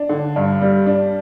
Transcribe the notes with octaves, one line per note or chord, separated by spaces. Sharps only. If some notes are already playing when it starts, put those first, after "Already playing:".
Already playing: D4
D3
G2
G3
D4